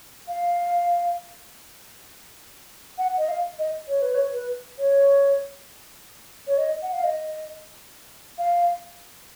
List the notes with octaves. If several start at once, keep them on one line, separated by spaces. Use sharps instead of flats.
F5
F#5
D#5
F5
D#5
C#5
B4
C#5
B4
C#5
C#5
D#5
F#5
F5
D#5
F5